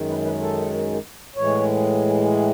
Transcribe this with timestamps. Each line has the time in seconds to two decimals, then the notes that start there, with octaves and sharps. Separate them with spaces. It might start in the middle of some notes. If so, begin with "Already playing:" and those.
Already playing: F#2 D#3 G#3
0.09 B4
0.25 B4
0.41 A4
1.36 A2 E3 G#3 C#5